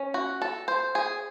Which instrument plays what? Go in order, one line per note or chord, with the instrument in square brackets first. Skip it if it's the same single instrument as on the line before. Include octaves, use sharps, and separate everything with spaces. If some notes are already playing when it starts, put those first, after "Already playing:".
Already playing: [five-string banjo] C#4
F#4
A4
C5
G#4